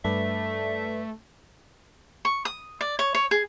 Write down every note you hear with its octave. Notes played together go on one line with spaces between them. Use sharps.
G2 A3 A4 B4 D5 E5
C#6
D#6
D5
C#5
C#5
G#4